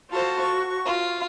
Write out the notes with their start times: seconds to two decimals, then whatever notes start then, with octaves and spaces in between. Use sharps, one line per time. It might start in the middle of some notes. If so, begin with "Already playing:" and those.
0.11 F4 F#4 A4 C5
0.42 C#6
0.85 F4